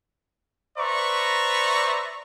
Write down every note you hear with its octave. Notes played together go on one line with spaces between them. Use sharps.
B4 C5 D5 E5 A#5 C#6